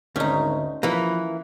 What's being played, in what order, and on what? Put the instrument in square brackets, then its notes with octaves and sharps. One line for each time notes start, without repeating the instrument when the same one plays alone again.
[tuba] G#1 [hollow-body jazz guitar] D2 [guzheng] C#4 D#4
[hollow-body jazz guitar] E3 A#3 [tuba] F3 [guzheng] B4